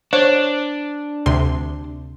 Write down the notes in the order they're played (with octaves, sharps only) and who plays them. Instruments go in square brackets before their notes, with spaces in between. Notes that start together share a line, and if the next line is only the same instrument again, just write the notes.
[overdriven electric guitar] D4 [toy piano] C5 [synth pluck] C#5
[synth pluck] D2 C3 C6